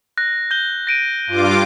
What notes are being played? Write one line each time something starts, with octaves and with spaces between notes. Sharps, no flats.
F#6 A#6
G6 G7
A#6 D7 D#7
G2 F4 D6